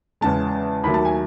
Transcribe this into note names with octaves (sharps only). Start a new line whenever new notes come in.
E2 C#3 G#3 A5
D#2 D#3 F#3 A3 B5
A5
G#5